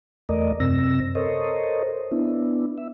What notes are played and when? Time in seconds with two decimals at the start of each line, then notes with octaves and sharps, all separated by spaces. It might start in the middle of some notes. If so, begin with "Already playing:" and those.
0.29 E2 A3 A#4 D5 D#5
0.60 F#2 C3 C4 E6 A#6
1.15 A4 A#4 C5 C#5 D#5
2.11 B3 D4 E4
2.78 E5